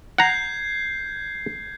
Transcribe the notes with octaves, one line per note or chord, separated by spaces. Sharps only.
F#5 A#5 G6 G#6 C7